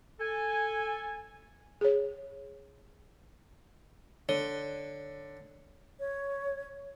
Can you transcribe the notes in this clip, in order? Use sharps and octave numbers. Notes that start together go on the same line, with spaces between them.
A4 G#5
G#4 C#5
D3 C#5
C#5